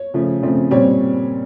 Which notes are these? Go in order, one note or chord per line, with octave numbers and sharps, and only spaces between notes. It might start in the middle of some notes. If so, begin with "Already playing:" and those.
Already playing: C#5
C#3 F3 A3
C#3 F3 A3 C4
A#2 G3 C4 C#5